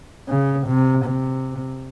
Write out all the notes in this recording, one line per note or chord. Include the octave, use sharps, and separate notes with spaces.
C#3
C3
C3